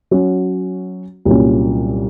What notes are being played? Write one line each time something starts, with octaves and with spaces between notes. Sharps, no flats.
F#3 C#4 F#4
C2 A#2 F#3 C#4